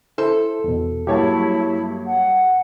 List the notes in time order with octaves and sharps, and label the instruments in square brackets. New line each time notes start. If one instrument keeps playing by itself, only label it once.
[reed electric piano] E4 C5 [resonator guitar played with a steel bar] A4
[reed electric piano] E2 B2
[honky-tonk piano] G2 C#5 A5 [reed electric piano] F#3 A#3 G4 [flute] E4
[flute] F#5